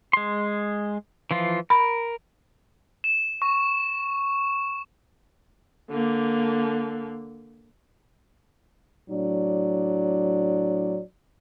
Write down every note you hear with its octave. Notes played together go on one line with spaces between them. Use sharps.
G#3 C6
E3 F3 F4
A#4 B5
E7
C#6
D3 A#3
A2 F#3 D4 D5